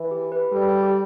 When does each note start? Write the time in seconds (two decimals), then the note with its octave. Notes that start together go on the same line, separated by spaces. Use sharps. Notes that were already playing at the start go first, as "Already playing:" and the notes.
Already playing: E3
0.11 G4
0.32 B4
0.52 G3 A4
0.83 G4